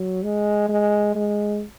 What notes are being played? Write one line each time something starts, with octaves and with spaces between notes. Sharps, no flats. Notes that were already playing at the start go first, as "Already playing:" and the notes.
Already playing: F#3
G#3
G#3
G#3